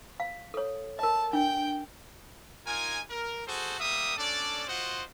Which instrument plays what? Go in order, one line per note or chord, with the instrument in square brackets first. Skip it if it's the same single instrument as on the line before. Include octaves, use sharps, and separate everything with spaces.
[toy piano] F5
A4 C#5
[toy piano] A#4 D#5 [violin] A5
[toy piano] D4 [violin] G5
[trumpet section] D#4 F4 A#4 G#5
A#4
F#4 G#4 A4 C5
G3 A#3 E5 D#6
C#4 D4 A4 D5
F4 F#4 C5 D#5 F#5